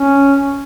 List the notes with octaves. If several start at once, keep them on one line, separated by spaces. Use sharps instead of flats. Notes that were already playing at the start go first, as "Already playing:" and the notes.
Already playing: C#4